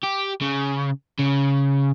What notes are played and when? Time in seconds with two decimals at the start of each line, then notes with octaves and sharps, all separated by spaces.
0.03 G4
0.41 C#3
1.19 C#3